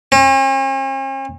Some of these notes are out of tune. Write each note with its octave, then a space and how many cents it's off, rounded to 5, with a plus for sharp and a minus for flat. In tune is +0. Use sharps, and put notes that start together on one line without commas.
C#4 -45